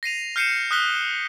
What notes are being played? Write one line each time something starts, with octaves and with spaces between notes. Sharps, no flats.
A#6 C7 D#7 F7
F6 G6 C7 C#7 D#7 E7
D#6 F6 F#6 B6 G7